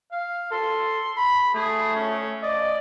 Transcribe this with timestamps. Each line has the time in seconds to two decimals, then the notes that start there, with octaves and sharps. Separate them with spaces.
0.12 F5
0.52 A4 C6
1.17 B5
1.54 A3 G#4
1.96 C#4
2.43 D5 D#5